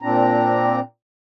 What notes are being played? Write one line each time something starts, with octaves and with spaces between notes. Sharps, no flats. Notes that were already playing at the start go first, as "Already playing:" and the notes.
A#2 C4 D4 A#5